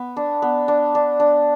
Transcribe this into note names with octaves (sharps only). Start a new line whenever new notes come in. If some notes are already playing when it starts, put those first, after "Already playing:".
Already playing: B3
D4
B3
D4
D4
D4